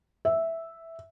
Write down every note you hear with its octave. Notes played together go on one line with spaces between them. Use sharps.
E5